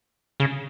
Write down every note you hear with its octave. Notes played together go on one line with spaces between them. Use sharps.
C#3